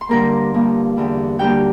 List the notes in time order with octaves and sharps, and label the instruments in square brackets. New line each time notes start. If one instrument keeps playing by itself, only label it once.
[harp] C6
G2 D3 G3 A#3 A#4 A#5
G2 F3 A#3
E2 D3 G3
D2 D3 G3 A#3 G4 G5